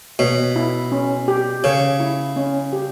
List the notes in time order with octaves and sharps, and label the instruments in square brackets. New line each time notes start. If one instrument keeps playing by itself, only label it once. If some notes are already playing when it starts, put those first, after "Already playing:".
[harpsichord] B2 [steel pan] C#5
[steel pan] E4
C#4
G4
[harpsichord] C#3 [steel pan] C#5
[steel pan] E4
C#4
G4